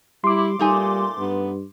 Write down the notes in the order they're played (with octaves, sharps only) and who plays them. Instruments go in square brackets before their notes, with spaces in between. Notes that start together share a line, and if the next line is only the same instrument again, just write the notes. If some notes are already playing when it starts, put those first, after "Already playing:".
[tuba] G3 [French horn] E4 [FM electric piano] C6 D6
[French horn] A#2 [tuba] G3 [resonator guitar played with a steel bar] A3 D#4 G#5
[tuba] G2 [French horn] B3